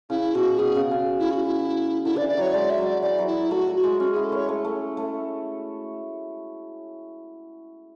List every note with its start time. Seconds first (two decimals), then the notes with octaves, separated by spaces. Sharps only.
0.10 C#3 E4
0.35 B2 F#4
0.59 B2 G#4
0.75 C#3
0.91 C#3
1.19 E4
1.31 F#4
1.44 E4
2.05 D3 E4
2.16 D3 D5
2.21 E3
2.29 D5
2.37 F#3 C#5
2.53 G#3 D5
2.70 E5
2.78 F#3
2.86 D5
3.02 E3 D5
3.18 F#3
3.27 E4
3.51 A3 F#4
3.67 F#3
3.76 F#4
3.84 G#3
4.00 C#4 F#4
4.12 E4 G#4
4.24 A4
4.32 C#4 C#5
4.49 A3
4.65 A3
4.97 A3